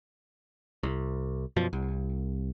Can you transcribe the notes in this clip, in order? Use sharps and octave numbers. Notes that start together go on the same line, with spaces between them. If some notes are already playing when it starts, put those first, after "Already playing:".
C2
F#2 B2 F3
C2